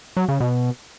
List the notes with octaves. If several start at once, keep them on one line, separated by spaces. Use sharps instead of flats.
F#3
C#3
B2